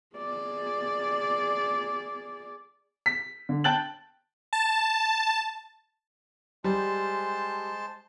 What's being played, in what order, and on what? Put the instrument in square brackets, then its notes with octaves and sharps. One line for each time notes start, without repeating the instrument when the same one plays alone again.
[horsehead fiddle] G#4 D5
[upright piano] B6
D3
G5 A5 F#6 A6 F#7
[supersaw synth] A5
[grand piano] G3 [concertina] G#3 C5 A5